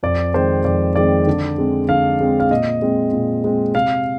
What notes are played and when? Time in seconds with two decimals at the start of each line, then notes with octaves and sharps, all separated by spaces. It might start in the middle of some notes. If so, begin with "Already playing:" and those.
0.03 F2 D5
0.34 D#3 G#3 C4 C5
0.64 F2 D5
0.96 D#3 G#3 C4 D5
1.27 D3
1.58 G#3 C4
1.89 D3 F5
2.21 G#3 C4
2.40 F5
2.50 A#2 D#5
2.82 G#3 C4
3.13 A#2
3.44 G#3 C4
3.75 C3 F5